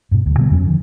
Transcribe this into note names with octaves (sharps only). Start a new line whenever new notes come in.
G2 B2
D2 G2
B2 D3 G3 B3
F2 F#3 C#4
D3 D#3 F3